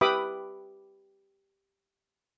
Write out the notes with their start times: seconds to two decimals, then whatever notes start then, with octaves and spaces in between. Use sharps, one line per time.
0.01 G4 B4 E5 B5 D6 D#6